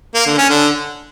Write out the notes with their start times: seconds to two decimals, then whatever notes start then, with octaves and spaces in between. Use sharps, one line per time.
0.15 A#3
0.26 D3
0.38 C#4
0.49 D3